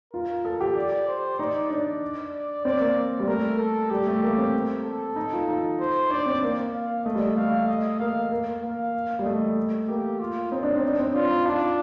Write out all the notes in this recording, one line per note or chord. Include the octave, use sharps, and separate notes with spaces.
F4 A#4
A4
G4
D5
C5
D#4 D5
D4 D5
D5
C4 D5
A#3
G3
A3 A#4
A4
G3 G4
A3
A#3
C4
A4
D#4
F4
D#4
C5
D4 D5
C4
A#3
F5
A3 D#5
G3
A3 F5
D#5
A#3 F5
A#3
A#3 F5
G3
A3 D#5
A#3 G4
F4
C4 D#4
D4
C4
D4
C4
D4 F4
D#4
D4 F4